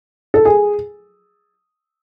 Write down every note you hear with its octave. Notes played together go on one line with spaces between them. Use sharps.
A4
G#4